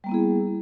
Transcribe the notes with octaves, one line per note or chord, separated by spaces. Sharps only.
G3 A#3 B3 E4 G#4